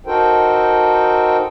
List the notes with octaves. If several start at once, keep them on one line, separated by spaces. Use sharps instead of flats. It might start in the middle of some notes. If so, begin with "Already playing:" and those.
D#4 F#4 A4 A#4 C5 G5